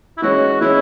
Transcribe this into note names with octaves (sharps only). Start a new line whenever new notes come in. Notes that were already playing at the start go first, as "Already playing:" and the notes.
E4
E3 G#3 C#4 F#4
E3 G#3 C#4 E4